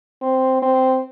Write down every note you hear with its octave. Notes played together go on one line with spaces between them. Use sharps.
C4
C4